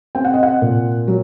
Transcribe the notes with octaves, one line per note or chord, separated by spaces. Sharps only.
C4 G5
F#5
D#5
F#5
A#2
F#3